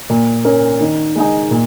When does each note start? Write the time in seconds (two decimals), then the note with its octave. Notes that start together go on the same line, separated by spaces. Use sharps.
0.10 A#2
0.45 A#3 C#4 A#4
0.81 D#3
1.16 G#3 D#4 G#4
1.51 A#2